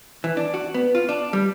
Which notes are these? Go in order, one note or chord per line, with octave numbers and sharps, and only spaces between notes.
E3
D4
F#4
B3
F4
D4
G3